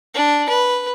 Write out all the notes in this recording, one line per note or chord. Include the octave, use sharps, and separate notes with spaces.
D4
B4